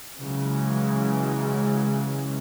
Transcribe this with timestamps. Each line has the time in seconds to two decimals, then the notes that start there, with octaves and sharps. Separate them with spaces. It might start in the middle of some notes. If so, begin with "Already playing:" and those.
0.19 C#3 E3 F#3 G#3